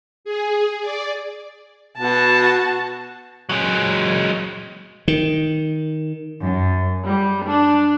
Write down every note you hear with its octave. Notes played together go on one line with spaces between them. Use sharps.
G#4
D5
B2 F#4 A5
F#3 G#3
D#3
F#2
G3
D4